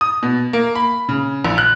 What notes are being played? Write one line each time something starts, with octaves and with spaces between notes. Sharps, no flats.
D#6
B2
A#3
B5
C#3
A#1
F#6